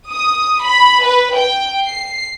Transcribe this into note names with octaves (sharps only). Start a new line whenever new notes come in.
D#6
B5
B4
G5
C7